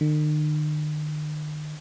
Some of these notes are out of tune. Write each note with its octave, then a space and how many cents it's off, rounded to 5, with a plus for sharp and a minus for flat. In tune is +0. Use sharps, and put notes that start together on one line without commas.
D#3 -45